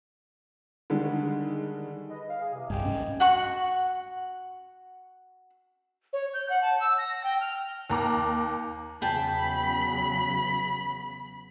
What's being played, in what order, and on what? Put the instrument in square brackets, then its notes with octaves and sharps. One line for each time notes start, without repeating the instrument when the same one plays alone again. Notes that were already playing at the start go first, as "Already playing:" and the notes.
[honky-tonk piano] D3 D#3 G3 G#3
[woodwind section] B4 D#5
F5
G#4
E2 C3
[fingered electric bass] C2 G2 [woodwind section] D#5 G5 G#5
[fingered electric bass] D#1 G#2 C#4
[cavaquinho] F#4 F#5 C#6
[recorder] C#5
G6
F#5
A5
E6
A#6
G5
F6
[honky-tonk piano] D#2 A#5 D6
[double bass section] E2 C#3 F#3 [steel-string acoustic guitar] G#4 G5 A5 [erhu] B5